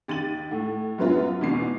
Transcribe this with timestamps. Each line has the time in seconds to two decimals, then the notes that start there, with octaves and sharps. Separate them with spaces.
0.08 D#2 A6 D#7 F#7
0.51 A2
0.98 F#2 F#3 B3 C#4 F4
1.41 E2 G#2 B2 C7